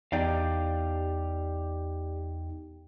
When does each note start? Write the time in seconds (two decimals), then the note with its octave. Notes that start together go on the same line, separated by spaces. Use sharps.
0.12 E2 D#4 G4 D5 F5 G5